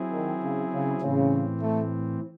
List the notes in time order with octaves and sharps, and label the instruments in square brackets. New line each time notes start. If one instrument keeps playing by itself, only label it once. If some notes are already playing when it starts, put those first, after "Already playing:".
Already playing: [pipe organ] F#3 C4 E4 G#4
[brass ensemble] D#3
C#3
C#3
[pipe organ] A2 E3 C4 [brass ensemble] C#3
[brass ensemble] A3